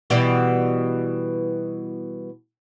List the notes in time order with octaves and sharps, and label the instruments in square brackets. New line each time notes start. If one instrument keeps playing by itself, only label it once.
[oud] B2 E3 G3